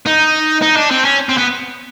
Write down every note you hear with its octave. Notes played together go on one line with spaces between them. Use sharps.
D#4
D#4
D4
C4
C#4
C4
B3